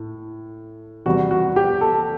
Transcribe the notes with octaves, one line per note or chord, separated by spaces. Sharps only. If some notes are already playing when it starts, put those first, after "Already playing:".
Already playing: A2
E2 C3 G3 F#4
F#4
G4
A4